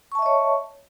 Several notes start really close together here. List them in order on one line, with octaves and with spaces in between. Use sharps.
C#6 A5 E5 D#5 C#5